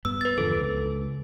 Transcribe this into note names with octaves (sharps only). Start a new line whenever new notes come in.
G2 B3 E6
B4 A6
E2 D3 F3 A4
C#2